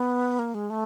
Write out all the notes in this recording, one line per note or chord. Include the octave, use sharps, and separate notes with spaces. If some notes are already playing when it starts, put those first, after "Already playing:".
Already playing: B3
A#3
G#3
A3